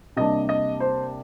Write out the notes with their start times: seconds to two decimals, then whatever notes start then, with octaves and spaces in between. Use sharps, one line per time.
0.16 C3 G3 A#3 D4 D#5
0.49 D#5
0.80 C5